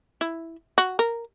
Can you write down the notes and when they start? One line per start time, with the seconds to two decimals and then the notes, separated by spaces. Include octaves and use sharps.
0.21 E4
0.78 F#4
0.99 A#4